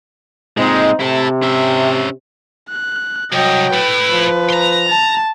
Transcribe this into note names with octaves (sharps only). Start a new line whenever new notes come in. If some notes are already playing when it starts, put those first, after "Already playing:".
A#2 G#3 C4 D#4
C3 E4 A4
C#4 E5
F#6
C2 F#3 D#5 G5
A3 E4 B4
F3
A#5 C6
A5